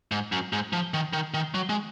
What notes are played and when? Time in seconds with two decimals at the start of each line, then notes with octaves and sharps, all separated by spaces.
0.12 G#2
0.32 F#2
0.53 G#2
0.73 F3
0.94 D#3
1.13 D#3
1.34 D#3
1.54 F#3
1.69 G#3